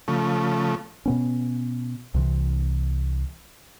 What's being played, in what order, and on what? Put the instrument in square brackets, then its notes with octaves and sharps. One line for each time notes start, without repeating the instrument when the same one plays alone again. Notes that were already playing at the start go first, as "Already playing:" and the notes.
[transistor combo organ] C#3 F3 A3
[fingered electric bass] B2 B3 C#4
C2 C3 E3